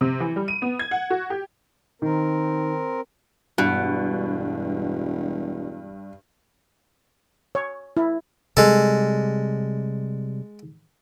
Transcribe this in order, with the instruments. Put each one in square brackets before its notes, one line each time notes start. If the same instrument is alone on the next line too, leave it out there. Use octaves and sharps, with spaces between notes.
[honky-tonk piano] C3
E3
G3
D#7
B3
G#6
F#5
F#4
G4
[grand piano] D#3 [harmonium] C4 A#4
[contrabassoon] E1 [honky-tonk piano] G2 [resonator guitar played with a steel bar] B2
[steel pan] C#5
E4
[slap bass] C3 G3 [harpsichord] G#3 A4